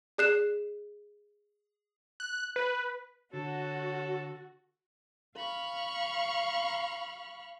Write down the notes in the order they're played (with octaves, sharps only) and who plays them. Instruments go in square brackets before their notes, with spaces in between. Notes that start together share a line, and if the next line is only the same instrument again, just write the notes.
[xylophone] G#4 D5 F#6 C7 E7
[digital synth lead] F#6
B4
[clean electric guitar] D3 [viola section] F#4 [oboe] A4 [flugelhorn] C#5
[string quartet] F5 B5 C#6 F6